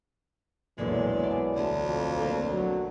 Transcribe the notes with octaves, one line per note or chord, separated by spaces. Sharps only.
B1 E2 A#2 D3 E3 G#3 B3
B3 D5 G#5 A5
D2
F2
D3 A#3 C4
F#3